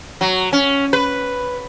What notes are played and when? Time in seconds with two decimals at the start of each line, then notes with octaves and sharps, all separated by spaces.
0.21 F#3
0.53 C#4
0.93 B4